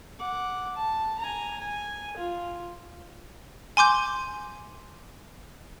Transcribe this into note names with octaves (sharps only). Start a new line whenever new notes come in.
F#5 D6
A5
G#5 A#5
G#5
F4
G#5 C6 D6 G6